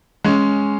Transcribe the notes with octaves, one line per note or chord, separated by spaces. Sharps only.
G#3 C#4